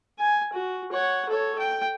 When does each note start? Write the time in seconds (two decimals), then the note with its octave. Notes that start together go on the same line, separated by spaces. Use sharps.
0.19 G#5
0.53 F#4
0.92 C#5 F#5
1.29 A4 C#5
1.59 G5